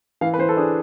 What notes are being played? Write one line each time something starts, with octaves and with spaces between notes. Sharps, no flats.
E3 F5
B4
E3 C5
A4
D4 G#4